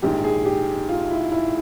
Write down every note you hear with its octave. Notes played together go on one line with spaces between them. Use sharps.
A#1 G#2 D#3 G4
G#4
G4
F4
E4
E4